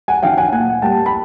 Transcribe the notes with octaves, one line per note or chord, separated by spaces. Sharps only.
F#5 G#5
D#3 F#3 F5 G5
F#5 G#5
A#2 F#5 G#5
G3 A#3 G5 A5
B5